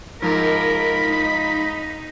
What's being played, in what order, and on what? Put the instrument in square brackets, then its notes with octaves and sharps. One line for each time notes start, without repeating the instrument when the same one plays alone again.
[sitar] G#2 F3 [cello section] A#4 [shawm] B5
[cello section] D#4